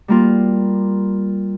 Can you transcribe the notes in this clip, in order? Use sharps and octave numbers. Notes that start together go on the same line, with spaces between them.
G3 A#3 F4